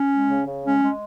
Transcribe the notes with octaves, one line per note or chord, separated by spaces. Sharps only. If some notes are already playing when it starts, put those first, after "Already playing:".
Already playing: C#4
G#3
C#3
C#3
G#3 C#4
G#3